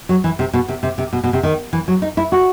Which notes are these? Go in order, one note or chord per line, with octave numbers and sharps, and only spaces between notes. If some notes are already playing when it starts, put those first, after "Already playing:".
F#3
E3
C3
B2
C3
C3
C3
B2
B2
C3
D#3
E3
F#3
D#4
E4
F#4